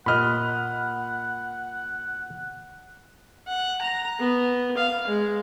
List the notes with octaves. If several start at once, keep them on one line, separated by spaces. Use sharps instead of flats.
A#2 D#5 F#5 B5 F6
F#5
A#5
B3
F5
G#3